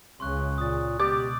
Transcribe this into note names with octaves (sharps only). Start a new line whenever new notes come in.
C#2 C#3 C6 C#6 F#6
A#2 D#6 A6
C#2 B2 G4 D5 D#6 G6 A6